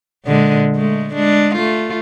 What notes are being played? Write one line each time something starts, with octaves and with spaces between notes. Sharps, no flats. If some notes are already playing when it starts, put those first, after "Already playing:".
A#2 D3 G#3
G#3 A3
G#3 D4
A3 F4